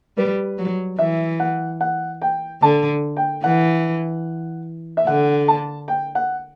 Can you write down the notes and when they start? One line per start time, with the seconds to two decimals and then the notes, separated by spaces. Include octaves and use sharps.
0.17 G3 B4
0.58 F#3
0.99 E3 E5
1.40 F#5
1.81 F#5
2.22 G5
2.62 D3 A5
3.17 G5
3.44 E3 F#5
4.97 E5
5.07 D3 F#5
5.48 A5
5.88 G5
6.15 F#5